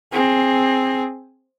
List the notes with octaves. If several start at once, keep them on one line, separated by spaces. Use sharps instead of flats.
C4 G#4